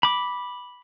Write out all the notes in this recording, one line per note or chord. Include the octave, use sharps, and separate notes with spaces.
B5 D6